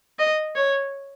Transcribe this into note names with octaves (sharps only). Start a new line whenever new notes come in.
D#5
C#5